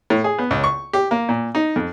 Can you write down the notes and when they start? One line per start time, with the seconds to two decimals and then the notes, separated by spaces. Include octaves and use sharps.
0.10 A2
0.24 G#4
0.39 B3
0.51 C#2
0.64 C#6
0.93 G4
1.11 A#3
1.29 A#2
1.55 D#4
1.76 F2